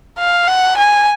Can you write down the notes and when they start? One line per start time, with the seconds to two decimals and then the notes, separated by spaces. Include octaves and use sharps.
0.18 F5
0.48 F#5
0.77 G#5